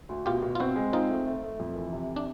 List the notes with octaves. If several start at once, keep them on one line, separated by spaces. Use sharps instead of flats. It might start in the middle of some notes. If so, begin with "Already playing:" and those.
D2
B2 F4 G4
B2
F4
C4 E4 F#4
G#3
C4 D#4 F4
A3
A3
A3
F2
E3
C3
D4